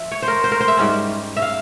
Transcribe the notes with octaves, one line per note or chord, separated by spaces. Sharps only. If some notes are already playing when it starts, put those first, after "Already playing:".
Already playing: F3 E5
C#5
C5
A#4
C5
A#4
C5
E5
G#2 G3 C#4
E5
F5